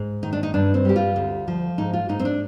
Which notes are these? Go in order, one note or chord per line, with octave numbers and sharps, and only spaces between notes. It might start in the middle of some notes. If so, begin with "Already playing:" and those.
Already playing: G#2
D#3 D#4
D4
D#4
G2 D4
C4
G3 G4
F4
D2
F3
G#2 D#4
F4
G#2 D#4
C4
D4